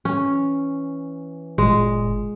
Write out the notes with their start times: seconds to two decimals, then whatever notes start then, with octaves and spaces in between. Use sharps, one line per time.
0.05 E3 C#4
1.58 G1 A#2 G#3